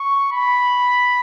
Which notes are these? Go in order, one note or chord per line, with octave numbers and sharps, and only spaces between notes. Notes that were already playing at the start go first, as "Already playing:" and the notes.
Already playing: C#6
B5